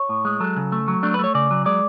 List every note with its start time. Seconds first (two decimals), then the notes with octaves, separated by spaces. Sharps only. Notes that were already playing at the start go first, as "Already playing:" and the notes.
Already playing: C#5
0.09 A2
0.25 G#3
0.40 F#3 A4
0.56 C#3
0.72 A3
0.88 F#3
1.03 A3 D4
1.14 B4
1.19 A3 C#5
1.35 C#3 D5
1.51 F#3
1.66 G#3 D5